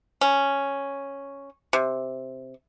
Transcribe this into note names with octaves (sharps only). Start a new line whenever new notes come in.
C#4
C3